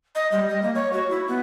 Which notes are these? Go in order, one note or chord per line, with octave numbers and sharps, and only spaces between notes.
D#5
G3
D#5
A#3
C#5
F#4
E4
B3